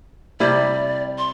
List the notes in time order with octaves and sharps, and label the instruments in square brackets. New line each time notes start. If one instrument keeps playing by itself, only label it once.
[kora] C3 G3 E4 [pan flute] D5
[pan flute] C6